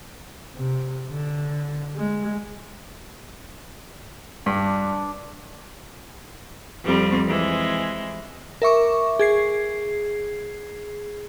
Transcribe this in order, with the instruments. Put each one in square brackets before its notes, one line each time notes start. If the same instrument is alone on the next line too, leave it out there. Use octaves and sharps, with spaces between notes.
[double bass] C3
D3
G#3
[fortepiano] G2 [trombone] D4
[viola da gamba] F2 G3 C4
E3 G#3 C4
[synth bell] A#4 E5 C#6 D6
G#4 G#6 C7